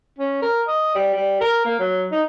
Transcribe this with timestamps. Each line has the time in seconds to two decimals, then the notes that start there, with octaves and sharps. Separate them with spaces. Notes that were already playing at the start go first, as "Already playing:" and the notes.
0.19 C#4
0.42 A#4
0.68 D#5
0.95 G3
1.15 G3
1.41 A#4
1.65 A#3
1.80 F#3
2.12 D#4